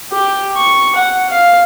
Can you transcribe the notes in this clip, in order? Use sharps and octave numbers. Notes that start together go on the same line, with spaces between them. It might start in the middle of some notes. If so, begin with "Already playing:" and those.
G4
C#6
F#5
F5